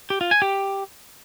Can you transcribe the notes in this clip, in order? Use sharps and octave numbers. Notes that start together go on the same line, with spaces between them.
G4
F4
G#5
G4